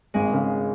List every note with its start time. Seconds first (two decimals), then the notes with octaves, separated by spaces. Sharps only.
0.14 G#1 G#3
0.33 C#3